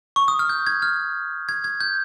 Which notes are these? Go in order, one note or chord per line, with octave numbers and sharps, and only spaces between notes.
C#6
D#6
F6
G6
G#6
F6
G#6
G#6
G6